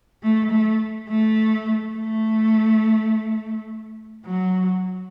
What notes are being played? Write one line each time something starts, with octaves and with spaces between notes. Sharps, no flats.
A3
A3
A3
A3
F#3